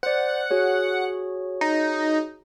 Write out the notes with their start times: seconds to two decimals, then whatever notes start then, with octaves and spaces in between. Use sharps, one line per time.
0.03 C5 D5 F#5
0.51 F#4 G#4 C#5
1.61 D#4